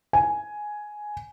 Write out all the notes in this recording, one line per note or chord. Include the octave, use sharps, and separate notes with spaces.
G#5